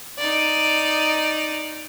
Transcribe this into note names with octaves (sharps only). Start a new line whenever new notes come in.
D#4 D5